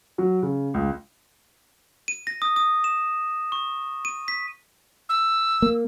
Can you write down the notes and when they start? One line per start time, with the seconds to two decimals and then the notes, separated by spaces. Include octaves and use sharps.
0.18 F#3
0.43 C#3
0.74 C#2
2.08 D#7
2.27 A#6
2.42 D#6
2.56 D#6
2.84 E7
3.52 C#6
4.05 D#7
4.28 B6
5.09 E6
5.62 A#3